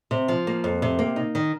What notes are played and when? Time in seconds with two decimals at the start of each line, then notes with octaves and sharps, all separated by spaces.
0.11 C3
0.28 F3
0.47 A#3
0.64 F2
0.82 C3
0.99 A#3
1.16 D#4
1.35 D#3